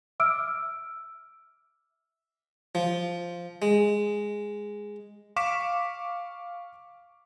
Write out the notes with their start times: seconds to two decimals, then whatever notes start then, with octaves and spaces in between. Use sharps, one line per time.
0.20 E5 D6 E6 F6 D7
2.75 F3
3.62 G#3
5.36 F5 C#6 D6 B6 E7